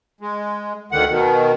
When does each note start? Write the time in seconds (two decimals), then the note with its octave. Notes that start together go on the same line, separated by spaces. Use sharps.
0.21 G#3
0.92 D2 D3 D#3 F#5
1.10 B2 D#3